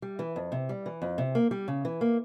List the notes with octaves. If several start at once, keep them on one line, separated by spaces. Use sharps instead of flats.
G3
E3
F2
C3
G3
E3
F2
C3
A#3
G3
C#3
E3
A#3